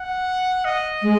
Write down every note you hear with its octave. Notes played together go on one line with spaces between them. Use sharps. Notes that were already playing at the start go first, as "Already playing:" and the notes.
Already playing: F#5
D#5
G#3